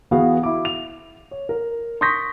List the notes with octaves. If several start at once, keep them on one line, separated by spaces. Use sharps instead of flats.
E3 B3 F#4 G#4 F5
E4 D6
F7
C#5
A#4
C6 C#6 D#6 G6 A#6 B6